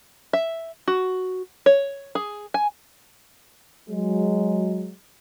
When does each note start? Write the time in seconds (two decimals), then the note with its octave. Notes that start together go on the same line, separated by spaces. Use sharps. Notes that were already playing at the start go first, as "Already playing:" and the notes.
0.33 E5
0.88 F#4
1.66 C#5
2.15 G#4
2.54 G#5
3.89 F#3 G#3